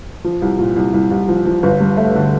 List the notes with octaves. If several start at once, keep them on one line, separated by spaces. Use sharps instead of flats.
F3
C2
A#2
C2
C2
C2
F3
F3
G1
G2
A3
D3